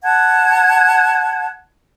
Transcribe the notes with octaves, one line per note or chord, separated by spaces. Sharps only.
F#5 A5 G#6